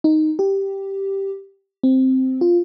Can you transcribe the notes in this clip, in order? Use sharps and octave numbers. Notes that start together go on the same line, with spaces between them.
D#4
G4
C4
F4